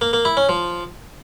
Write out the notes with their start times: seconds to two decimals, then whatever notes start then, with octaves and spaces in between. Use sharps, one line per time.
0.01 A#3
0.13 A#3
0.25 E4
0.37 C#4
0.49 F3